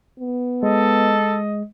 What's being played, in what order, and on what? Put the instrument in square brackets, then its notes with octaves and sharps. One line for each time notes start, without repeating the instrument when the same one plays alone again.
[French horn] B3
[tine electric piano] G#3 [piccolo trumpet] A4 [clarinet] D#5